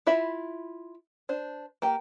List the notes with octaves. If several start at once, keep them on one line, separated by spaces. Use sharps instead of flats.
E4 F4 E5 B5
D4 C5
A#3 G4 G5